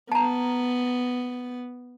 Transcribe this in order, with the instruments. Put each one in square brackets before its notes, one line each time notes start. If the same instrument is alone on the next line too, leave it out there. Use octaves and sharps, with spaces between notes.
[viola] B3 [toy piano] A5 A#5